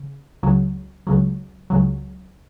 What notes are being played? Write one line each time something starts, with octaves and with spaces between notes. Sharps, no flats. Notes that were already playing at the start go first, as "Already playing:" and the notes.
Already playing: C#3
C#2 C#3 F#3
C#2 C#3 F#3
C#2 C#3 F#3